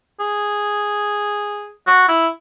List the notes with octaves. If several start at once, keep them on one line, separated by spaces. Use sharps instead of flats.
G#4
F#4
E4